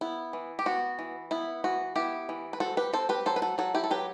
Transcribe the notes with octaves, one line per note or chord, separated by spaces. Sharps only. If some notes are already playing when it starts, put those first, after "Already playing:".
B3 E4
E3
G4
B3 F#4
E3
B3 E4
E3 F#4
B3 E4 G4
E3
B4
C4 F#4 A4
G4 B4
C4 A4 C5
G4 B4
F#3 A4 C5
B4
F#4 A4
F#3 F#4 A4
E4 G4
A4
F#3 G4 B4